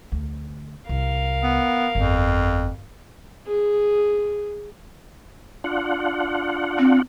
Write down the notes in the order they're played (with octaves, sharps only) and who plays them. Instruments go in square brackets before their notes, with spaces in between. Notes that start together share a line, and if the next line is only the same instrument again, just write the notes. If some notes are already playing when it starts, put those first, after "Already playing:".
[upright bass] D2
[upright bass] C2 [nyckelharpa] A#4 F5
[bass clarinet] B3
[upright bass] G1 [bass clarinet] F2
[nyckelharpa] G#4
[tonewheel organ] D4 F4 F#5
[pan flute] C4